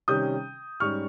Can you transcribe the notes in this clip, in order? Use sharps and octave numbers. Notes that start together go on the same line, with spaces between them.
C3 D#3 G3 C#4 D#6 G6
G#2 G3 C#4 C#6 F6